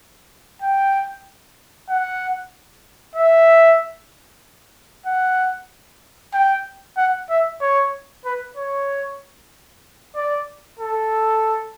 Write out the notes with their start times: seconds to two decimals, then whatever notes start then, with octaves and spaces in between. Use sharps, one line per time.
0.62 G5
1.89 F#5
3.16 E5
5.06 F#5
6.33 G5
6.97 F#5
7.30 E5
7.61 C#5
8.25 B4
8.56 C#5
10.15 D5
10.79 A4